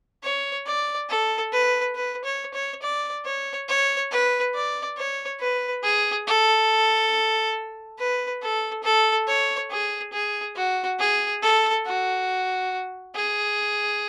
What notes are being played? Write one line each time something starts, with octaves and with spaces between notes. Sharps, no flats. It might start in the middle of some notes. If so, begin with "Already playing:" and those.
C#5
D5
A4
B4
B4
C#5
C#5
D5
C#5
C#5
B4
D5
C#5
B4
G#4
A4
B4
A4
A4
C#5
G#4
G#4
F#4
G#4
A4
F#4
G#4